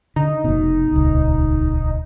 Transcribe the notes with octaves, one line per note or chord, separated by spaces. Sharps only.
D3 D#4
F1 B2
D#1 C#2